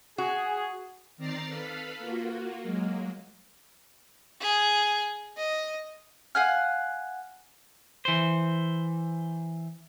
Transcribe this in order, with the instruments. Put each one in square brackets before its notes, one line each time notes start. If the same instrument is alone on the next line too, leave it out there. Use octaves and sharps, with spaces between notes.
[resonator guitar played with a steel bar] F#4 [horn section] G#4
[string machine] D#3 C4 D5 A#5 A6 C7
A4 B4 F5 B5
A#3 F4 F#4
F#3 G#3 A#3
[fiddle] G#4
D#5
[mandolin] F5 F#5 G#5 F6
[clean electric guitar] E3 C5